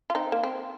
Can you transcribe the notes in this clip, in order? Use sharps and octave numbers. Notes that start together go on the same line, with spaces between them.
F4
C4 D#4
A#3
C4